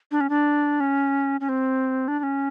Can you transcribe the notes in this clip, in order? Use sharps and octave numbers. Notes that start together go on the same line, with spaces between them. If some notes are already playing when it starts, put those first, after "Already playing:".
D4
C#4
D4
C#4
C#4
C4
D4
D4
C#4